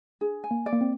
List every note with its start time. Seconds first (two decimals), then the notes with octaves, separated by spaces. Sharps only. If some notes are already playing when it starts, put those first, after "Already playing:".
0.21 D4 G#4
0.44 G#5
0.51 A#3
0.66 D5
0.72 A#3
0.81 C4